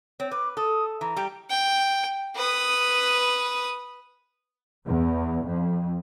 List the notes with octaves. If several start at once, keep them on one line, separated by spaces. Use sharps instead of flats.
C4 C#5
B4 D6
A4 D#6
E3 A#5
G3 G4
G5
B4 D#6
E2
F2